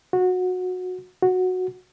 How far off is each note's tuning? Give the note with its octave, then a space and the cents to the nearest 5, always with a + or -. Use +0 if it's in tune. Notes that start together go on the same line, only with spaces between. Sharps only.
F#4 -20
F#4 -10